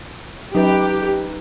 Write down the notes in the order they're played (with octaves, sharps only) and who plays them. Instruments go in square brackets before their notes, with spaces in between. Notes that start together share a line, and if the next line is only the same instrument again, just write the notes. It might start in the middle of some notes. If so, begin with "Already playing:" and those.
[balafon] F#3 C#4 [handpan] D#4 B4 [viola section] G4